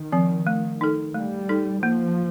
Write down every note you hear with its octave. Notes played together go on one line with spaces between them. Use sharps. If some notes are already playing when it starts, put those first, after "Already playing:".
Already playing: D#3
F3 C4
A3
D#4 A4
G3 A3
D#4 A4
F3 A#3